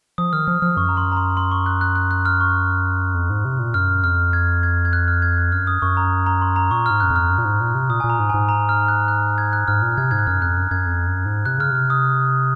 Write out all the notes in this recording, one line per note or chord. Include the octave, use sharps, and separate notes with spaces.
F3 D#6
D#3 F6
F3 F6
F3 F6
F#2 C#6
A#5
C6
A#5
C6
C6
C#6
F#6
F#6
F#6
F#6
F6
C#6
F2
G#2
C3
A#2
F#2 F6
F2 F6
G#6
G#6
G#6
F#6
F6
G#6
F#6
F#2 F6
D#6
F#2 C#6
A#5
A#5
C6
A#5
A#2 C#6
G#2 F6
F#2 F#6
F2
F6
F#2
A#2
G#2
A#2
C3
A#2 D#6
A#2 G#5
A#5
G#2
G#2 G#5
A#5
F6
F#6
F#6
G#6
F#6
G#2 F6
A#2
C3 G#6
G#2 G#6
F#6
F#2 F6
F2 F#6
F#2
F#2 G#6
F2
F#2
G#2
C3 F#6
C#3 F6
C3 F6
D#6